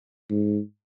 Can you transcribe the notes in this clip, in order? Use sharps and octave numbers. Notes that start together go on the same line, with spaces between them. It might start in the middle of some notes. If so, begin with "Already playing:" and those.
G#2